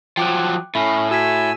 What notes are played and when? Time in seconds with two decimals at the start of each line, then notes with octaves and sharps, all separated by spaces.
0.17 F3 F#3 G5 D6 F#6
0.75 A2 C#4 E5 B5
1.11 F#4 G#5 E6 B6